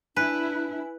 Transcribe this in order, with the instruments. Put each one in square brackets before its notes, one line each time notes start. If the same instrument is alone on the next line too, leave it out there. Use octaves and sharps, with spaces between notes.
[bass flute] D4 [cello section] E4 [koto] B4 [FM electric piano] G#5 F#6